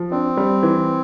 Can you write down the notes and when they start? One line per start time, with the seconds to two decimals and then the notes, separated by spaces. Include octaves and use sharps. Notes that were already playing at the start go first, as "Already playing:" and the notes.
Already playing: F3
0.11 C4 D4
0.37 G3
0.63 E3